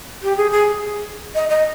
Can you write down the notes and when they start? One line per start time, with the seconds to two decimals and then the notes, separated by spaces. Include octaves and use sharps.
0.23 G4
0.37 G#4
0.51 G#4
1.35 D#5
1.49 D#5